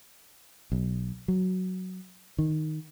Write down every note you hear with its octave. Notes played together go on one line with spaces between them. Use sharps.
B1
F#3
D#3